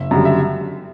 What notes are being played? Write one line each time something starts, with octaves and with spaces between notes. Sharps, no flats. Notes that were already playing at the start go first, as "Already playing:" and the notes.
Already playing: F#1 E5
F#2 D3 G3
E5